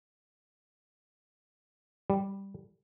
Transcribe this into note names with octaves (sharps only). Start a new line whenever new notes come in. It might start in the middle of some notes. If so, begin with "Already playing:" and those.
G3